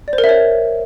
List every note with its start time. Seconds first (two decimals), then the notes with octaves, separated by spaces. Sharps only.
0.08 D5
0.13 C5
0.18 A#4
0.24 E5
0.29 C#5